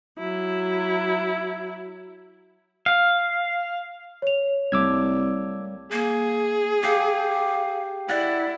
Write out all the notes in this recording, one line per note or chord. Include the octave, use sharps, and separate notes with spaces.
F#3 E4
F5
C#5 F7
C2 G3 A3 A#3 D6 E6 G#6
A#3 G#4
G4 F5
E4 D5 F#5